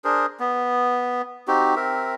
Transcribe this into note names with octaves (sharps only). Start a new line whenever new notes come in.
D4 G#4 A#4 C5
B3
C4 D#4 F#4 G4
C4 A#4 E5